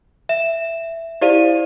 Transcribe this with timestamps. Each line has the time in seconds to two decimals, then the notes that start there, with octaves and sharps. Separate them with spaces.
0.29 E5 E7
1.21 E4 G4 C5 D5 F5 D#7